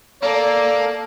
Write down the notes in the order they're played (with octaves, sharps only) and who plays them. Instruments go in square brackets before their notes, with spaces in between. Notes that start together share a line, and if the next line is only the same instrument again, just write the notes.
[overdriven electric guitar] A#3 [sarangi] A4 [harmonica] D5